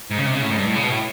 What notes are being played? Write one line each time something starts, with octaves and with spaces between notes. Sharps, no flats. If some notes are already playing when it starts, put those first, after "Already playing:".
G#2
C#3
C3
C#3
A2
G#2
G2
A2
C#3
B2
A2